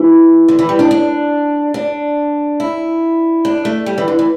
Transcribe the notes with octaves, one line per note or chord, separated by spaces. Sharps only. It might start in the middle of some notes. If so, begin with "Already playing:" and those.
Already playing: E3
D3
E3
G3
D4
D4
D4
E4
D4
A3
G3
E3
D3
E3